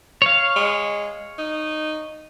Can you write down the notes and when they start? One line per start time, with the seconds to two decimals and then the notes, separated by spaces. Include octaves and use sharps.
0.22 C#5 F5
0.56 G#3
1.38 D#4